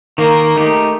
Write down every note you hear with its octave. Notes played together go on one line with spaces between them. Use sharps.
D#3 A#3
A3 D#4 G4